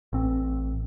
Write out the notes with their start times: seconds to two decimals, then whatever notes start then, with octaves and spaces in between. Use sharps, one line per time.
0.13 A1 C4